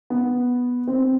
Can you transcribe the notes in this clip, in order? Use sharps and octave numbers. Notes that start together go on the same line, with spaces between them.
B3
C4